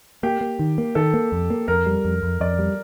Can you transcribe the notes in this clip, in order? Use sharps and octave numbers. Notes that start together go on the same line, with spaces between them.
A#3 G4
A#3
D#3
A#3
D#3 A4
A#3
F2
A#3
F2 A#4
G3
F2
F2
F2 D5
G3